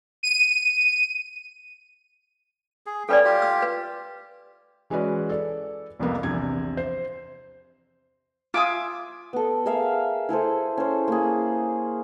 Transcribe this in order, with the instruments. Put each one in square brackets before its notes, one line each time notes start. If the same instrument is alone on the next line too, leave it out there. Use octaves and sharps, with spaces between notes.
[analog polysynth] D#7
[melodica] G#4
[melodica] G3 C#4 G5 [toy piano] A4 B4 D5
[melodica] F4 G4
[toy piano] E6
B4
[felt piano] E3 G#3 C#4 F#4 B4 D5
A4 D5
C2 F2 C3 A#3 B3
A#1 E2 C3 G#6
C5
[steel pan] F4 D6 [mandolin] E5 G#5 D#6
[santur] B3 A4
G#4 A#4 E5 F5
E4 G#4 A4 C5
C#4 C5
A#3 G#4